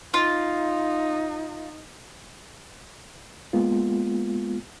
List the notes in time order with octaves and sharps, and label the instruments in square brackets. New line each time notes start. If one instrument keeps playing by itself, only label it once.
[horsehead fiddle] D#4 [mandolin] F4
[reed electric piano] G#3 A#3 B3 F4